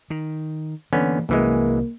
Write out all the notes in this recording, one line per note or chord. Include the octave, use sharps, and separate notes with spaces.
D#3
D3 E3 F#3 A#3 B3 C#4
C2 F#2 E3 G#3 A#3